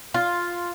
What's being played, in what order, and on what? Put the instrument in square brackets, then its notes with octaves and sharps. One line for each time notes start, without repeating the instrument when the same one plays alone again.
[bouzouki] F4